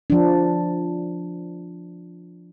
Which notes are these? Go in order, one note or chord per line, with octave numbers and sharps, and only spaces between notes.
F3 D4